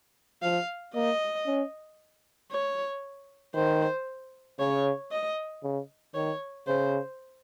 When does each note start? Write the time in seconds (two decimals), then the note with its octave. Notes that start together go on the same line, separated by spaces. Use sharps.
0.42 F3 F5
0.95 A#3 D#5
1.47 C#4
2.51 C#5
3.55 D#3 C5
4.59 C#3 C#5
5.12 D#5
5.63 C#3
6.15 D#3 C#5
6.67 C#3 C5